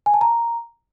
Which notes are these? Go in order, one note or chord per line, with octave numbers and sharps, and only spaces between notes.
G#5
A5
A#5